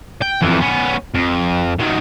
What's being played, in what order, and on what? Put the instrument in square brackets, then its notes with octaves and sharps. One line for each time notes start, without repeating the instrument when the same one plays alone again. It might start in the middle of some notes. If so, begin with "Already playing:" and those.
[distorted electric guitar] G5
F2 E3
B3 C#4
F2
D#3 F#3